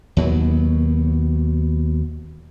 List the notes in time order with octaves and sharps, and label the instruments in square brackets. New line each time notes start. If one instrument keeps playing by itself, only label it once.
[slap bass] D#2 B2 F#3